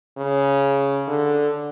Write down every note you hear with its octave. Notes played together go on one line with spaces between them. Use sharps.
C#3
D3